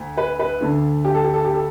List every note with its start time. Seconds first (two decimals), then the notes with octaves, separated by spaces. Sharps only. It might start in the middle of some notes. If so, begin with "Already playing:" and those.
Already playing: D2 A3
0.17 B4
0.39 B4
0.60 D2 D3 A3
1.05 G4
1.15 A4
1.24 G4
1.34 A4
1.45 G4
1.54 A4